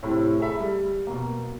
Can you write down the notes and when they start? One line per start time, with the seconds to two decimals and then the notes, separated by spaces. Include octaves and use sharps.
0.03 A2 C3 E4
0.39 G#4 A4 E5 B5
0.60 G3
1.07 B2 A#3